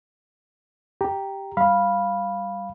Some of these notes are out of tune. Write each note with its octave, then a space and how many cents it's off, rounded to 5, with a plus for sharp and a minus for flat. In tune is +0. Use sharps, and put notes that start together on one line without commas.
G4 +0 A#5 +0
G3 +0 F5 +0 B5 -10